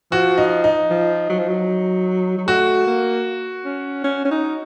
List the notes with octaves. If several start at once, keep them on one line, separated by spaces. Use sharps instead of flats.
F3 F#4
D#4
D#4
F3
F#3
F3
F#3
F#3
A3 F#4
A#3
C#4
C#4
C#4
D#4